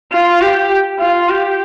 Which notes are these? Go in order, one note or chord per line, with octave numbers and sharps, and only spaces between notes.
F4
G4
F4
G4